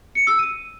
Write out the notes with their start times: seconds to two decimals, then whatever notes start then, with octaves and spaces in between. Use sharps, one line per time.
0.15 C#7
0.27 E6
0.39 D#7